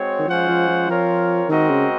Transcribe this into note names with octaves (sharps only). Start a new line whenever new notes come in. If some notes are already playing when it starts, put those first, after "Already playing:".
Already playing: G#3 C4 F#4 C#5
D#3
F3 G#3 C#4 F4 C5 F#5
F3
F3
F3 C4 F4 A#4 C#5
D#3 G#3 C4 F#4 A#4 D#5
C#3